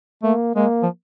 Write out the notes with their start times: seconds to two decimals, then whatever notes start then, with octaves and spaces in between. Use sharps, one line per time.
0.23 A3 A#3
0.56 G#3 A#3
0.82 F3